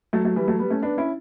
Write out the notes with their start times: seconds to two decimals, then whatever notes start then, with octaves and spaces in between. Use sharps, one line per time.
0.13 F#3 A3
0.25 F#3 A3
0.36 E3 G3
0.48 F#3 A3
0.59 G3 B3
0.70 A3 C#4
0.82 B3 D4
0.97 C#4 E4